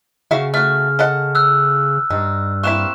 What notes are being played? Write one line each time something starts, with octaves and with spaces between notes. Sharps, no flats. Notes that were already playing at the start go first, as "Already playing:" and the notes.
C#3 F#4 E5 F5
A3 F#4 F6
A4 D#5 F#5
E6 F#6
G2 D#4
A#3 C4 E4 C#6 F#6 E7